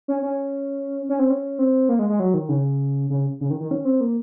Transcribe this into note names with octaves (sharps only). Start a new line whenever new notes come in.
C#4
C#4
C#4
C4
C#4
C4
A#3
G#3
G#3
F#3
D#3
C#3
C#3
C#3
D#3
D#3
C#4
C4
A#3